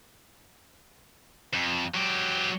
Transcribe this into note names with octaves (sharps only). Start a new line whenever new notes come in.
F2
F#3 G4